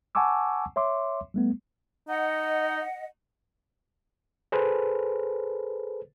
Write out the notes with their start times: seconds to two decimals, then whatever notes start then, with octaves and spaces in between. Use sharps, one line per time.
0.15 F#5 G#5 A5 C#6 D6 E6
0.76 C#5 E5 C6 D6
1.34 G3 A3 B3
2.08 D#4 D#5 F#5
4.52 G#4 A4 B4 C5